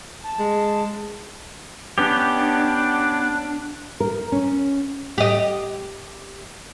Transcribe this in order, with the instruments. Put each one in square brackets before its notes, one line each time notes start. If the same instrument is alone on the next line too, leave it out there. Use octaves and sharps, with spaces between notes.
[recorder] A5
[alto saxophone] G#3
[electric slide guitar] B3 C#4 G4 [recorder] D4
[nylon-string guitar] A#4
C#4
[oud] G4 D#5